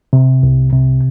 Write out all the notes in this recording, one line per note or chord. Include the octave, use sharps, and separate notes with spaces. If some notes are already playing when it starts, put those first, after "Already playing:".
C3
C2
C3